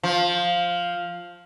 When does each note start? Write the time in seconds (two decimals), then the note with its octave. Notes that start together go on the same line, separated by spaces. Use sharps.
0.03 F3